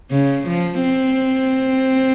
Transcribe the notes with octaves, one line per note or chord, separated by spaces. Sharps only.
C#3
F3
C4